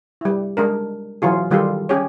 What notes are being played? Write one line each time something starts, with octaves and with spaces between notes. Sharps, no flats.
G3 E4
G#3 D4 A#4
E3 F#3 F4 G#4
D#3 G3 F4 G4 A4
C#4 G4 G#4 C#5